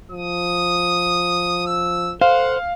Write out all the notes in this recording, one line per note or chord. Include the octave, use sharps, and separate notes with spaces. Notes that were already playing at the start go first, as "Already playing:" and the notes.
F3 D#6
E6
A4 C5 F5 F#5